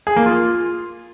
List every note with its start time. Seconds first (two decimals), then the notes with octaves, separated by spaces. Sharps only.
0.07 G#4
0.16 A#3
0.26 F4